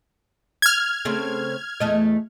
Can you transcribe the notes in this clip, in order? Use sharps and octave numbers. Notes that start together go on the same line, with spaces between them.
F6 G#6
C#3 A3 C4
E2 A3 D#5